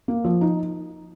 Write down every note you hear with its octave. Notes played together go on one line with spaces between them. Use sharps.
A#3
F3
D#4